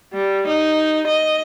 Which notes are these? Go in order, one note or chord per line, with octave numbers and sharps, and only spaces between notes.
G3
D#4
D#5